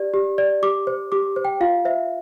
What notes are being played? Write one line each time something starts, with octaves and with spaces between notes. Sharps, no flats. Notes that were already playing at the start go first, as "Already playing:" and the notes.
Already playing: G4 D5
G4
D5
G4 D6
C5
G4 D6
C5
G5
F4 F5
C5 E5